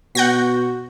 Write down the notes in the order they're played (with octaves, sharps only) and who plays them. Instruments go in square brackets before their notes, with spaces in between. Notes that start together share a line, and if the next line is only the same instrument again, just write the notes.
[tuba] B2 [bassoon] F#4 [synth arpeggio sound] F#5 G6 A#6